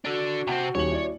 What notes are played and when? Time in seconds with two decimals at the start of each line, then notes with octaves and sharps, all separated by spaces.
0.05 D3 D4 F#4
0.47 C3 C4 F#5 A5
0.75 D#1 D#2 C#5 F#7
0.91 E4 D5